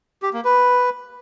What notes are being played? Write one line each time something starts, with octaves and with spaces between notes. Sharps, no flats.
G4
A#3
B4